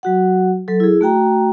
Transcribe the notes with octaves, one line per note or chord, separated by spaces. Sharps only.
F#3 F#4 F#5
F#3 A4
E4 G#4
A3 F#4 G5 A#5